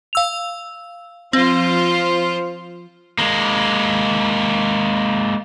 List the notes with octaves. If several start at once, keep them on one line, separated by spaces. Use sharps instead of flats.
F5 E6 F7
F3 C4 F4 C5
G#3 A#3